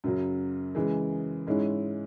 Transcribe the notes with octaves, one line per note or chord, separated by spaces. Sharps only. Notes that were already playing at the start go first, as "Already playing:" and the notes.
F#2 C#3 F#3
C#3 E3 G#3
G#2 G#3 C#4 E4